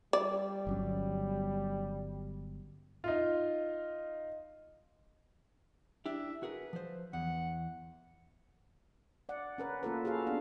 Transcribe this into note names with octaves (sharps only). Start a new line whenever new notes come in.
G3 D5
G1 F#3 C#4
D#4 F4
D4 E4 G4 E5
F#4 G#4 A#4 B4
F3 C5
E2 F#5
D5 F#5
C#4 A#4 B4
A#3 F4 A4 B4
F#4 G#4 A4 F5
B3 D4